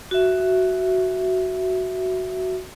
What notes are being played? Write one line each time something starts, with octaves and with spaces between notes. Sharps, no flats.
F#4 E5